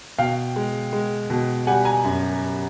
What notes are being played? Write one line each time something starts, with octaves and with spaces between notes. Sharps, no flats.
B2 F5 G5
G#3
G#3
B2
G3 F#5 G#5
G#5 A#5
F#2